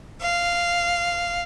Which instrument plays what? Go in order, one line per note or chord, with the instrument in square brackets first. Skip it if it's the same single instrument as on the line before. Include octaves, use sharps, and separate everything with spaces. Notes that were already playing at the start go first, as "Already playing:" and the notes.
[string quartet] F5